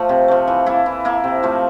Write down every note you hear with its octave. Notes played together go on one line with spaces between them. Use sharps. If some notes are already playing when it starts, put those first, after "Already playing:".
Already playing: F3 A3
C3
F3 A3
E3
A#3 E4 A4
E3
A#3 E4 A4
C3
F3 A3